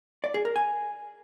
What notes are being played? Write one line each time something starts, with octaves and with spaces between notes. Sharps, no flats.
D5
G#4
A#4
G#5